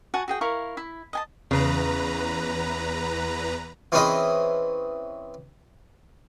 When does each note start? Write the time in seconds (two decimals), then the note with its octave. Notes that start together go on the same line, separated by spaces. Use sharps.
0.14 F#4 F#5 G#5 A5
0.28 F#4 G#4 G5
0.41 E4 A#4 F5 C#6
0.77 E4
1.13 D#5 G#5 A5
1.51 E2 C#3 B4 A#5
3.92 E3 C4 C#4 G#4 B4 D#5